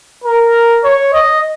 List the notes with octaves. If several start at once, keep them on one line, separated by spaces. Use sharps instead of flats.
A#4
C#5
D#5